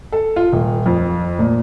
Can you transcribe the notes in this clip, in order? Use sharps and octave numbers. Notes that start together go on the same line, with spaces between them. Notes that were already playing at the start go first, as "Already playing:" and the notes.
A4
F4
D#1
F2
A#2